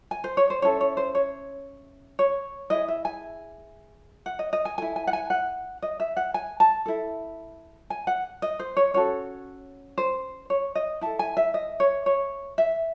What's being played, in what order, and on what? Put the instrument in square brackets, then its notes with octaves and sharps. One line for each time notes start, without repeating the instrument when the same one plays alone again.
[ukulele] G#5
C5
C#5
C5
C#4 E4 A4 C#5
C#5
C5
C#5
C#5
E4 G#4 D#5
E5
G#5
F#5
D#5
D#5
G#5
E4 A4 G#5
G#5
F#5
G#5
F#5
D#5
E5
F#5
G#5
A5
E4 A4
G#5
F#5
D#5
C5
C#5
C#4 F#4 A4 C#5
C5
C#5
D#5
E4 A4 A5
G#5
E5
D#5
C#5
C#5
E5